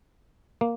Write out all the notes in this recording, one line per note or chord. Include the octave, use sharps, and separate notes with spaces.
A#3